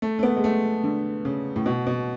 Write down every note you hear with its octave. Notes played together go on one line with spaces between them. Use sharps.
A3
A3
B3
G#3
A3
D3
C#3
A2
B2
B2